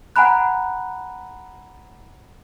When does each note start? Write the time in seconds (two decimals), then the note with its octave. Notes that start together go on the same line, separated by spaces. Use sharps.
0.16 F#5 G#5 A#5 B5 F#6